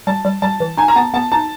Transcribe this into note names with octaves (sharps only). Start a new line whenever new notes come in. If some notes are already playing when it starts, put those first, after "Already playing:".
G3 A5
G3
G3 A5
E3
D#4 G#5
A#5
B3 A5
B3 A5
D#4 A5